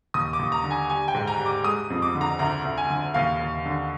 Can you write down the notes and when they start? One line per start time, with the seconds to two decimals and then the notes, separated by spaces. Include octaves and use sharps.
0.14 D#2 D#6
0.33 D6
0.39 D#2
0.52 A#5
0.64 D3
0.71 G#5
0.89 G3 G#5
1.08 G5
1.14 G#2
1.28 A#5
1.39 G3
1.46 D6
1.64 G#3 D#6
1.90 F2
2.02 D6
2.15 D3
2.21 A#5
2.39 D2 A#5
2.65 D2
2.78 G#5
2.90 D3
3.14 D#2 F5
3.40 D#2
3.65 D3